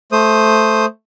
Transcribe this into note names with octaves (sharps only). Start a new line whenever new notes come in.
A3 C5 D#6